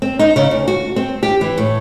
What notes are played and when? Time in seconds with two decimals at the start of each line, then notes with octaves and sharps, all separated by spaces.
0.02 C4
0.19 D#4
0.36 C#3
0.51 D2
0.68 F#4
0.96 C4
1.23 G4
1.41 E3
1.58 A2